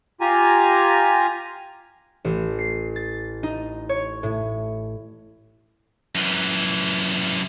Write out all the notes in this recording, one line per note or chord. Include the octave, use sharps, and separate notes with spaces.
F4 G4 G#5 A#5
A1
C7
A6
D#4
C#5
A2
F#2 E3